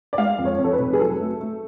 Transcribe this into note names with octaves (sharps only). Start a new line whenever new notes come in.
D5
G#3 F5
F2
C#5
F2
A4
B4
F1
G#4
F#3 A4
A3
A3